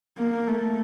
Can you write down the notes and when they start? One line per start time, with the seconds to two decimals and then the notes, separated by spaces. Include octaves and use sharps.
0.19 A#3
0.47 A3